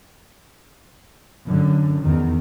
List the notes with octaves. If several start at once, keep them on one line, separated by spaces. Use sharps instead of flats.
F#2 D3
E2 D#3